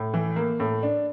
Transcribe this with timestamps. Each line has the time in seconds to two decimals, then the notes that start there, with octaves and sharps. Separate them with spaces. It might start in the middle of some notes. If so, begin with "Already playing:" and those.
Already playing: A2
0.14 E3
0.36 A#3
0.60 A2
0.83 D4